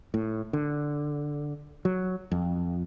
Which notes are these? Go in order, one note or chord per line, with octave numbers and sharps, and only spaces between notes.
A2
D3
F#3
F2